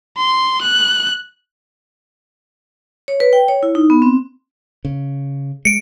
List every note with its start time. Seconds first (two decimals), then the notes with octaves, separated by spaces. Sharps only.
0.17 C6
0.62 F#6
3.08 C#5
3.20 B4
3.33 G5
3.48 C#5
3.63 E4
3.75 D#4
3.90 B3
4.02 C4
4.85 C#3
5.65 G#3 C#7 D7